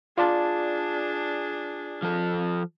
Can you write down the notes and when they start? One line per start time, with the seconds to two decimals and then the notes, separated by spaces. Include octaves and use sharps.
0.18 D4 F4 G#4 D5 A5
2.02 F3 A4